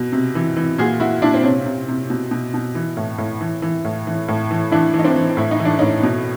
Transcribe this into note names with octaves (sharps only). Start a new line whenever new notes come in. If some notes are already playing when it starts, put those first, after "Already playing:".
Already playing: B2
C3
E3
E3
A#2 F#4 G#4
A#2 E4 F#4
A#2 D4 E4
C4
C3 C#4
C3
C3
B2
B2
B2
E3
A2
A2
E3
E3
A2
E3
A2
E3
E3 D4 E4
E3
D#4
C4 D4
E3
A2 E4
D#4
E3
D4
A2 C#4 D#4
B2